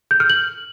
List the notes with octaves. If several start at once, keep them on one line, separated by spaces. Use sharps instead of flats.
G6
F6
F#7